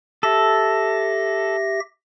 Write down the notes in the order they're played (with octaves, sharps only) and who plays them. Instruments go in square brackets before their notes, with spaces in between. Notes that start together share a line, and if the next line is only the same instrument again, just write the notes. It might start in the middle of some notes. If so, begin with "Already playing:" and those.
[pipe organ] G4 E5 A#6 [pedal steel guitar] A4